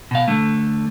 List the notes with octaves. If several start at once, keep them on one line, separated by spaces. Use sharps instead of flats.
B2 F5
D3 A3